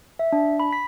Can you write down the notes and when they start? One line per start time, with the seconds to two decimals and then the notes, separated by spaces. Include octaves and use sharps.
0.19 E5
0.32 D4
0.60 B5
0.73 B6